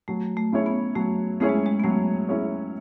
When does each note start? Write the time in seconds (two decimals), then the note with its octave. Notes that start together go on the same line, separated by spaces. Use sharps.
0.08 F#3 A3
0.37 A3
0.52 C#4 E4 G#4 C#5
0.66 B3
0.96 F#3 A3
1.40 A3 C#4 E4 G#4 C#5
1.49 G#3
1.66 G#3
1.80 B3
1.84 F#3 A3
2.29 C#4 E4 G#4 C#5